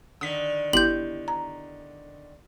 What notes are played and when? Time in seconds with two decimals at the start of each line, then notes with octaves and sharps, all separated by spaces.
0.21 D3 D#3 D#6 B6
0.73 G1 B3 E4 G4 G6 F#7
1.28 A#5